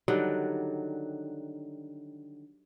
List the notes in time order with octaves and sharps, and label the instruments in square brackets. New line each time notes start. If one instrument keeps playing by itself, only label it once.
[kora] D3 D#3 F#3 G3